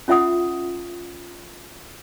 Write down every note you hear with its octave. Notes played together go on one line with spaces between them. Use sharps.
C#4 F4 E5 F#5 D#6